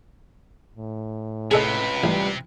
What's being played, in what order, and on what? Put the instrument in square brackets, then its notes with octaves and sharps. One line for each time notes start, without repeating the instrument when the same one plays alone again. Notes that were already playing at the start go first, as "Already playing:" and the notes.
[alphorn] A2
[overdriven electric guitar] C#2 B4 [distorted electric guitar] C3 [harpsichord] G#4 A4 D#5
[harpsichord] A1 [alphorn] G3